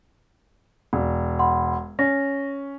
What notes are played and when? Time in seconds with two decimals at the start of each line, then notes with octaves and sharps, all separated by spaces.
0.93 E1
1.39 F#5 B5 C6
1.99 C#4 A#6